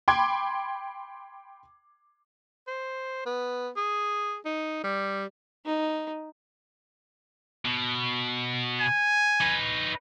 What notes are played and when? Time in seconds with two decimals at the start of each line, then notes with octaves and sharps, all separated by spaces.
0.08 G5 B5 C6 D6 G#6
2.67 C5
3.26 B3
3.76 G#4
4.45 D#4
4.84 G3
5.65 D#4
7.65 B2
8.80 G#5
9.41 D#4 B4